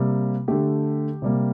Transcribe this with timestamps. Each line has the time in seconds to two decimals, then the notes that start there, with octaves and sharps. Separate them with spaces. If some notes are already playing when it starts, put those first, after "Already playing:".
Already playing: C3 G3 A#3
0.48 D3 A3 G4
1.22 C3 G3 A#3